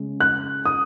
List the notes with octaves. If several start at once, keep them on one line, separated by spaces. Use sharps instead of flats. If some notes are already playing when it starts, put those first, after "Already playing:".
Already playing: C#3 G#3
F#6
D#6